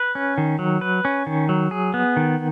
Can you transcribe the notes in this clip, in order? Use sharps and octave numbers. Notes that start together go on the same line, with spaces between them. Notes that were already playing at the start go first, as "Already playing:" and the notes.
Already playing: B4
C#4
D#3
F#3
B4
C#4
D#3
F#3
G#4
B3
D#3